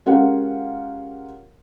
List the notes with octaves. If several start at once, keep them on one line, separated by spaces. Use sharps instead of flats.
G#3 C#4 F4 G4 A#4 F#5